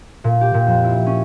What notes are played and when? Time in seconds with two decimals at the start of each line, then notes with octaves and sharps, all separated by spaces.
0.24 A#2
0.41 G4
0.54 A#2
0.67 F2
0.84 E4
1.06 C#4